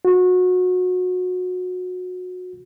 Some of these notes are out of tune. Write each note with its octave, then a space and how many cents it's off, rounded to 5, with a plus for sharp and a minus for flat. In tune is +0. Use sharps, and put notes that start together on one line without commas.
F#4 -25